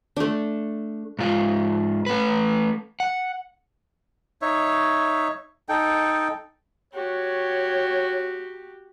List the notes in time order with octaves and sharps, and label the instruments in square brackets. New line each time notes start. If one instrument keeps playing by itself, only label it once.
[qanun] A3 D4
[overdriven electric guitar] G#2 F4
A3 B4
F#5
[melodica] D#4 C#5 E5
D#4 A4 G5
[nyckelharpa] F#4 G4 [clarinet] C#5